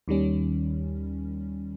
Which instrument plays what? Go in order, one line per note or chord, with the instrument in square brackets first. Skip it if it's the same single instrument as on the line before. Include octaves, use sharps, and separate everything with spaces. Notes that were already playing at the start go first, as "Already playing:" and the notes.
[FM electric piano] D#2 D#3 G3 C#4